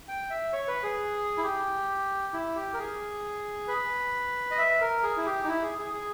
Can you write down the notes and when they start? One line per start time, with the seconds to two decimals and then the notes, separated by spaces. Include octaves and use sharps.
0.08 G5
0.30 E5
0.53 C#5
0.68 B4
0.83 G#4
1.37 E4
1.43 G4
2.33 E4
2.56 G4
2.74 A#4
2.78 G#4
3.68 B4
4.51 D#5
4.58 E5
4.81 A#4
5.03 G#4
5.17 E4
5.26 G4
5.44 D#4
5.48 E4
5.63 G#4
5.78 G#4
5.93 G#4